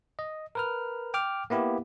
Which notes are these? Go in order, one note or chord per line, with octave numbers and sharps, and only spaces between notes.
D#5
A#4 B4 F6
G5 D6 F6
A#3 B3 E4 G4